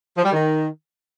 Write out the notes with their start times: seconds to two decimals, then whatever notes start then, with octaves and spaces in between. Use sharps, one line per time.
0.17 F3
0.25 G3
0.32 D#3